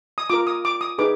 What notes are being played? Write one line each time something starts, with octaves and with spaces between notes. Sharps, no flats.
D#6
F4 A#4 D6
D#6
D6
D#6
D#4 G#4 B4 D6